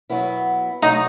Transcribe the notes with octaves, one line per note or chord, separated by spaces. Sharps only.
B2 F#3 B3 E4
B2 F#3 A3 D#4